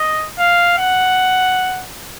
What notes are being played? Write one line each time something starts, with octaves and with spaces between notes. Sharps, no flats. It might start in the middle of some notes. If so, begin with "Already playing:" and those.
Already playing: D#5
F5
F#5